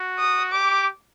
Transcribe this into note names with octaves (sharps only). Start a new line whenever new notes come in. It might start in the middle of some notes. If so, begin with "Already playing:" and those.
Already playing: F#4
D#6
G4 D6